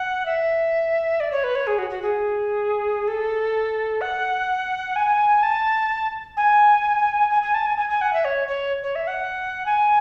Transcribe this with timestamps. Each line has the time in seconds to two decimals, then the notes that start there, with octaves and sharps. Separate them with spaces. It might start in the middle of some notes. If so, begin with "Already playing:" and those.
Already playing: F#5
0.25 E5
1.20 D5
1.32 C#5
1.44 B4
1.55 C#5
1.67 G#4
1.78 F#4
1.90 F#4
2.02 G#4
3.08 A4
4.01 F#5
4.96 G#5
5.43 A5
6.37 G#5
7.31 G#5
7.43 G#5
7.54 A5
7.66 G#5
7.78 G#5
7.89 G#5
8.01 F#5
8.13 E5
8.25 C#5
8.48 C#5
8.83 C#5
8.95 E5
9.07 F#5
9.66 G#5